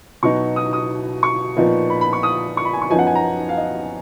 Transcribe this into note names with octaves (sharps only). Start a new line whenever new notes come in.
B2 F#3 B3 D#4 C#6
D#6
D#6
C#6
A#2 F3 B3 D#4
B5
B5
C#6
D#6
C#6
B5
G#5
C#6
F#2 F3 B3 D#4 G#5
F#5
G#5
A#5
F5
D#5